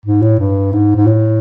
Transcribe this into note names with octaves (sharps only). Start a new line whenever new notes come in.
G#2
A2
G2
G#2
G#2
A2